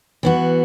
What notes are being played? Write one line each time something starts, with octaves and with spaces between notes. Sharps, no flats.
E3 B3 F#4